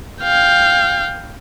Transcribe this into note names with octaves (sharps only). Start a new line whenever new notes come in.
F5 G5